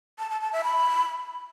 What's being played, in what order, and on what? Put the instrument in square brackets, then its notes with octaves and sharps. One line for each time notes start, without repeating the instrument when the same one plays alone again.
[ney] A5
A5
A5
E5
B5